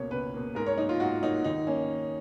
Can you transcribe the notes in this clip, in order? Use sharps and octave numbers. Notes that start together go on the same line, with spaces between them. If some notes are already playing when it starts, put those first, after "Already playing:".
Already playing: C#2 B2 A#3 C#5
C#2 B4
B2 A#3
G#2 A#4
C#5
F#3 A#3 D#4
F4
G#2 F#4
F#3 A#3 D#4
D#2 D#4
A#3 C#4